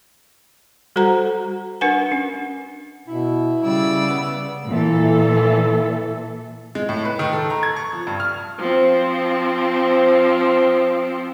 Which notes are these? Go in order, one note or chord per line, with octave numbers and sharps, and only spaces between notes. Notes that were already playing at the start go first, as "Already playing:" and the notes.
G3 F#4 A4 C5 F#5 A#5
D4 A#4 B4 F#5 G#5
C#4
B2 E4
C#3 G3 D5 E6
B3
A#2 E3 A4
G#3
A2
B4
D#3
A4
A#5
G#6
C#6
F3
G2
F6
F3 C4